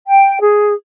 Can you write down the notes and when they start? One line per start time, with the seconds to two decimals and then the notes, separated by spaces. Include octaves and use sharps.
0.08 G5
0.40 G#4